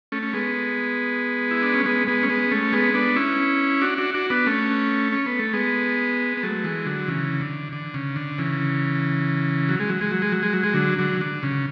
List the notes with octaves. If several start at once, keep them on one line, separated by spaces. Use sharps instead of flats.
A3 C#4
C#4
G#3 B3
E4
D4
C#4
G#3 B3
G#3 B3
C#4
G#3 B3
A3 C#4
G#3 B3
B3 D4
C#4 E4
D4 F#4
D4 F#4
D4 F#4
B3 D4
A3 C#4
C#4
B3
A3
G#3 B3
B3
F#3 A3
E3 G#3
D3 F#3
C#3 E3
D3
D3
C#3
D3
C#3 E3
F#3
G#3
F#3
G#3
F#3
G#3
F#3
G#3
F#3
G#3
D3 F#3
D3 F#3
D3
C#3